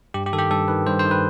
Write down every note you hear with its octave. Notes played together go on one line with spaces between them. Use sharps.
G2 G4
G4
D#3 A4
G4
G2 A4
D#3 B4
G2 C5
C5
D#3
B4